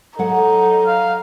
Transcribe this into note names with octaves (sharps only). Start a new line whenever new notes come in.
F#3 D#4 A4 F#5
F5